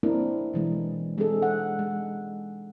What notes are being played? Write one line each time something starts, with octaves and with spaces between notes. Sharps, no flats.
A#3 C4 D4 E4 A#4
B2 E3 G#3
G#3 C4 D4 G#4 A4
F#5
G#3